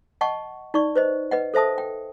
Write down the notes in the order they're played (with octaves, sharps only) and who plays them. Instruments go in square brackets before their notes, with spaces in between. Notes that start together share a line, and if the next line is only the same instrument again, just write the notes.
[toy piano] D#5 F#5 A5 C#6
D#4 D5 C#6
B4 C5 D#5
B4 D#5 F#5
A4 C5 E5 A5 D#6
G5